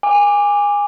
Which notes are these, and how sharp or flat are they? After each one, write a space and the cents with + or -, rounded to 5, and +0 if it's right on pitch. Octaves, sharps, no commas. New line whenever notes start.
G#5 -20 D6 +0